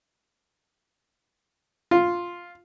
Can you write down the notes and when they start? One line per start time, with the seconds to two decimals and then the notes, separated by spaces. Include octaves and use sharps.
1.91 F4